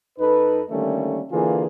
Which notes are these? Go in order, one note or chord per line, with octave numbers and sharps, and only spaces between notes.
F#2 D#4 A4 B4
D3 D#3 G3 A3 A#3 C#4
D3 E3 A#3 F4 G#4